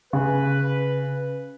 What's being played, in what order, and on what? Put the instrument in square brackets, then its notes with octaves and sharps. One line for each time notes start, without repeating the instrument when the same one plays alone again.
[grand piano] C#3 [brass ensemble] B4